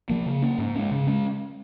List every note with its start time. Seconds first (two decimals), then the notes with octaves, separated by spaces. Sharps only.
0.10 F3 A#3
0.26 C#3
0.42 A#3 C#4
0.58 G#2
0.75 G#3 C#4
0.91 C#3
1.07 G#3 C#4